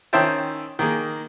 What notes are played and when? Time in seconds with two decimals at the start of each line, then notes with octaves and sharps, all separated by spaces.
0.13 D#3 C#4 C5 E5 G5 A5
0.79 D#3 A#3 G#4